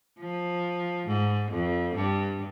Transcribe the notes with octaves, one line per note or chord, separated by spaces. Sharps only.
F3
G#2
F2
G2